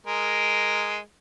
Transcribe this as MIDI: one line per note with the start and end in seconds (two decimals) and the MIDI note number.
0.06 0.98 56
0.06 0.98 70